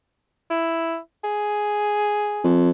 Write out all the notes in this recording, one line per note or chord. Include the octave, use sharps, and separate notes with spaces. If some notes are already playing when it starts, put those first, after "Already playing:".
E4
G#4
F2